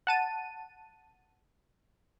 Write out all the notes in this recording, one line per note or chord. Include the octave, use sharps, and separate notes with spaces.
F#5 A5 D#7